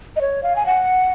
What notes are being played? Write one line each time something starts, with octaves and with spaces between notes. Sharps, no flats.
D#5
C#5
F5
G#5
F#5